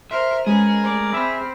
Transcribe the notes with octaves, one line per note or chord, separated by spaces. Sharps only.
A#4 C5 E5 C6 F6
G#3 C#4 G#4 A#4 B4
A3 D5
C4 E5 B5 F6